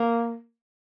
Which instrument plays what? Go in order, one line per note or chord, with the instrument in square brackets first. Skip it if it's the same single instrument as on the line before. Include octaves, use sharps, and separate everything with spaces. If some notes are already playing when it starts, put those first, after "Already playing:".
Already playing: [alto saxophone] A#3